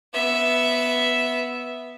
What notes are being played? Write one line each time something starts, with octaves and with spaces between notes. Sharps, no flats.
B3 E5